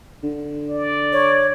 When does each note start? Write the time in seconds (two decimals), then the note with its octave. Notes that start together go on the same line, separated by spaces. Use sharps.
0.23 D3
0.70 D5
1.13 C#5